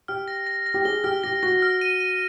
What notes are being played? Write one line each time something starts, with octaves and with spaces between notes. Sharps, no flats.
G4 F6
A#6
A#6
A#6
G4
G#4 G7
G4 F6
G4 A#6
F#4 A#6
F6
D#7
D#7